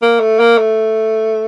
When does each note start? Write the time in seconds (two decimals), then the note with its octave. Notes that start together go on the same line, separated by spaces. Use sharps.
0.02 A#3
0.20 A3
0.40 A#3
0.58 A3